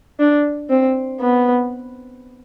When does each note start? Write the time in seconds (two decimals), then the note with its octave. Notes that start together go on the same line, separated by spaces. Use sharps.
0.20 D4
0.70 C4
1.21 B3